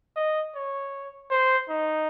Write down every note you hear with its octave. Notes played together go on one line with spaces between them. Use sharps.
D#5
C#5
C5
D#4